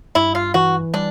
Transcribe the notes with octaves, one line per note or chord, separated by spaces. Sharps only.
G2 E4
F4
E3 F#4
G3 D4